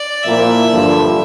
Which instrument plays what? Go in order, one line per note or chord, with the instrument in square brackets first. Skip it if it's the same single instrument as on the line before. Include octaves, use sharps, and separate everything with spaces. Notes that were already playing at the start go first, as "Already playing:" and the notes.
Already playing: [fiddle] D5
[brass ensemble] A#2 F3 A#3 E4 [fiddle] E5
[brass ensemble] G2 D3 F3